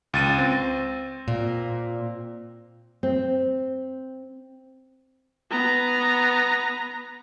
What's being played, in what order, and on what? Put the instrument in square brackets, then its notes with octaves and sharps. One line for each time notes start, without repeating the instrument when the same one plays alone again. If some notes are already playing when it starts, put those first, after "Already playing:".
[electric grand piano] C#2 A6 D#7
C4
[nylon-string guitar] A#2
C4
[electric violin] B3 A#5